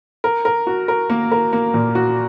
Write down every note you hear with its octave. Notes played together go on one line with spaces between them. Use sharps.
A#4
A#4
F#4
A#4
A#3
A#4
A#3
A#2
F#4